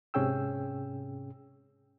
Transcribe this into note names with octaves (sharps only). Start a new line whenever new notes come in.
G#2 C3 C#4 G#4 G5 E6